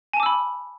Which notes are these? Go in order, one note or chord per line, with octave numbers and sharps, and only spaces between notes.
G#5 A5 B5 D6 E6